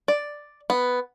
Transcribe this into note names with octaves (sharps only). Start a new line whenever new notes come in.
D5
B3